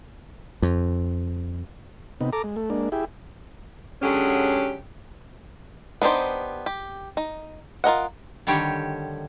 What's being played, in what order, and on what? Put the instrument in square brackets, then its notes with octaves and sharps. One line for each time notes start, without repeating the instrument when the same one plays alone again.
[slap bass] F2
[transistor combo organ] C3 B3 D#4
A4 A#5 D6
G#3
A3
G#3 A#3 D4
E4 G4 G#4
[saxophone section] D3 F#3 G#3 C#4 G4
[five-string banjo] B3 D4 D#4 G4 C5
G4
D#4
F4 A#4 D#5 F#5
[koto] D3 D#3 G3 G4 C#5